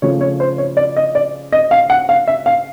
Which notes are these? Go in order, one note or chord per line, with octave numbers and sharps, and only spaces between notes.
C#3 F3 A3 C#5
C#5
C5
C#5
D5
D#5
D5
D#5
F5
F#5
F5
E5
F5